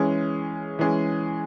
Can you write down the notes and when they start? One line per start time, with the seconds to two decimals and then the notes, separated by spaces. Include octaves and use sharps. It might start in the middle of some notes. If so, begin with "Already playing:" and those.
Already playing: E3 G#3 C#4 G#4
0.79 E3 G#3 C#4 G#4